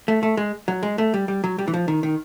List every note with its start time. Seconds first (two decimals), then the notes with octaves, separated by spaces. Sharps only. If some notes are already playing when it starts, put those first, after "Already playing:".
0.08 A3
0.23 A3
0.37 G#3
0.68 F#3
0.83 G#3
0.98 A3
1.14 G3
1.28 G3
1.44 F#3
1.58 G3
1.68 E3
1.74 F3
1.88 D#3
2.03 D#3